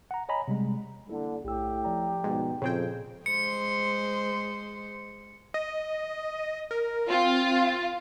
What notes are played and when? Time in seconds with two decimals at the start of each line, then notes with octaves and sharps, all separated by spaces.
0.11 F#5 A#5
0.29 C#5 D#5 G#5 A#5 B5
0.48 C3 G3 G#3
1.09 D3 A#3 E4 A4
1.44 B1 A2 G4 E6
1.85 F3 D5 A#5
2.24 G#2 B2
2.62 F2 A#2 C#3 C4 G#4 G5 G#6
3.26 G#3 C5 C#7
5.54 D#5
6.71 A#4
7.10 C4 F4